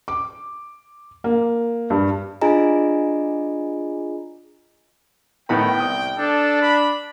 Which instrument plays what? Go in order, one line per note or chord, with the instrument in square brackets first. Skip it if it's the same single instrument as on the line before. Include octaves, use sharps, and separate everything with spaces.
[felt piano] D6
A#3
G2
[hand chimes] D4 F4 G#4 D#5 G#5 A#5
[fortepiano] A2 B3 B5 [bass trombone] D#3 [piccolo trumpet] G5
[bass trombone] C2 [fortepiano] D#6
[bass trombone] D4 [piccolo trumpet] A4
[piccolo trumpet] B5